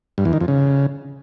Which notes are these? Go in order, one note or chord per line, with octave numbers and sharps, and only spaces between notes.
G2
E2
D#3
F2
C#3